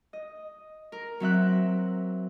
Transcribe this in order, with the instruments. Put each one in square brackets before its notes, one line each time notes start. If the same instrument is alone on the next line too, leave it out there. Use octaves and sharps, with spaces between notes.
[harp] D#5
A#4
F#3 C4 E5 F#6